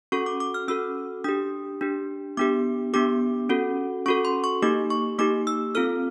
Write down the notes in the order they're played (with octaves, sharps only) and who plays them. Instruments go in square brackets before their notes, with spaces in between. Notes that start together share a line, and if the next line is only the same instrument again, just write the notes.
[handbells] C#4 F#4 A4 C#6
D6
D6
F6
C#4 F#4 A4 E6
D4 G4 D#6
D4 G4
B3 D4 G4 D6
B3 D4 G4 D6
C#4 F#4 A4
C#4 F#4 A4 C#6
C6
C#6
A#3 D#4 G4 D6
C#6
A#3 D#4 G4 D6
E6
C4 F4 A4 F6